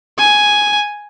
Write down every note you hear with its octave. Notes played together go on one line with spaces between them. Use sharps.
G#5